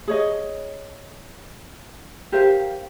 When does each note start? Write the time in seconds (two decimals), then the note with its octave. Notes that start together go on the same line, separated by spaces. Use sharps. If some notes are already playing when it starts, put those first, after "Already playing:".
0.08 G#4 C#5 D#5
2.32 G4 A#4 C5 F5